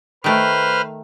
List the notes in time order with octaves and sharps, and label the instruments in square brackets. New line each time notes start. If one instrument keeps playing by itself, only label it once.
[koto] D#3 A3 [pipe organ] B4 C5 F6